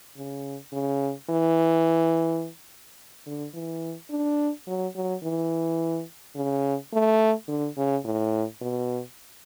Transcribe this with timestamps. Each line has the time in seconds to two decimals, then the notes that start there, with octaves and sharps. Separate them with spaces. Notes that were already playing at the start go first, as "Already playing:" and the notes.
0.17 C#3
0.72 C#3
1.30 E3
3.26 D3
3.54 E3
4.10 D4
4.67 F#3
4.95 F#3
5.23 E3
6.36 C#3
6.93 A3
7.48 D3
7.77 C#3
8.05 A2
8.61 B2